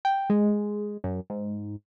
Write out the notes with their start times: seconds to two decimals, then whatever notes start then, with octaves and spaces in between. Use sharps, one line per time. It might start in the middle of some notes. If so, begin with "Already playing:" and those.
0.05 G5
0.30 G#3
1.04 F#2
1.30 G#2